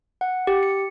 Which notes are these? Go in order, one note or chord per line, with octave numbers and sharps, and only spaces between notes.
F#5
G4
C#7